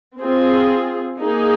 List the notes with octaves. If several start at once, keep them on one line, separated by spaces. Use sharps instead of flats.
C4 F4 G#4
A#3 D#4 G#4